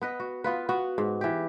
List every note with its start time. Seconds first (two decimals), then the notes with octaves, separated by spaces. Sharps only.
0.01 B3 B4 D#5
0.20 F#4
0.44 B3 F4 B4
0.69 B3 F#4
0.98 G#2
1.21 E3 G4